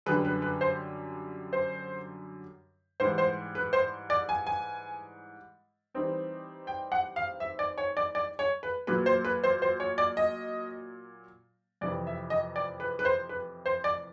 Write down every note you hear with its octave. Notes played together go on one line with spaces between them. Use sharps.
F#2 D3 G3 B4
B4
B4
C5
C5
G#2 E3 G3 C5
C5
B4
C5
D5
G#5
G#5
E3 G3 C4 D#4
G5
F#5
F5
E5
D5
C#5
D5
D5
C#5
B4
A#2 F#3 A#3 B4
C5
B4
C5
C5
C#5
D5
D#5
F2 C3 E3 D5
E5
D#5
D5
B4
B4
C5
B4
C5
D5